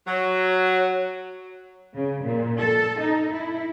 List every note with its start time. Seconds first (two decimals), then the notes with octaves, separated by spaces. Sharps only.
0.07 F#3
1.95 C#3
2.24 A#2
2.59 A4
3.01 D#4
3.33 E4